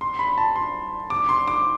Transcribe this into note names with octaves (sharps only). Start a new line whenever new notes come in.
C6
B5
A5
C6
D6
C6
D6